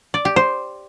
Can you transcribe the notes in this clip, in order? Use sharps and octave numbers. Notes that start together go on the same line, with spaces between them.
D5
G4
C5